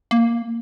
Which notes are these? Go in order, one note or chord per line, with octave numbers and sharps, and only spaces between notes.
A#3